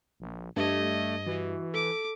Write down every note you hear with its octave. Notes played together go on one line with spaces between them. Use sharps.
A#1
G2 A3 D4 G4 D#5 G#6
E3 F#4
A4 D6